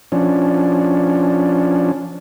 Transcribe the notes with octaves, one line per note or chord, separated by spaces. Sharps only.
F3 C#4 D4